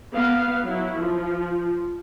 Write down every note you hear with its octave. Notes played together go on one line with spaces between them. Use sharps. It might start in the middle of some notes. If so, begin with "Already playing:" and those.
B3 F5
F#3 E4
F3